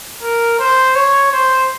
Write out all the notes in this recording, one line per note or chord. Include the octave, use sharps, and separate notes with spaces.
A#4
C5
C#5
C5